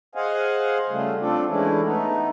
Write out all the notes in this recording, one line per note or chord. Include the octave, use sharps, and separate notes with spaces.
G#4 C5 D#5 F5 F#5 G#5
C#3 G3 A3 F4
A3 C4 D4 F4 A4 D5
E3 G#3 A3 C#4 D4 E4
A3 B3 D#4